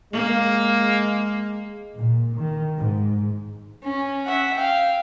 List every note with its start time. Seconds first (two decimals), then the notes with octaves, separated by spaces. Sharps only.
0.13 G#3 A#3
1.97 A#2
2.37 D#3
2.79 G#2
3.83 C#4
4.26 E5 F#5
4.56 F5 G5